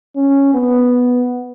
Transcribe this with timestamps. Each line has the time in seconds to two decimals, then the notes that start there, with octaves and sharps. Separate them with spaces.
0.16 C#4
0.54 B3